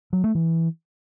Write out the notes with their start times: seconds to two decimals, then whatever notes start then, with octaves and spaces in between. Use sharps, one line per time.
0.13 F#3
0.24 A3
0.35 E3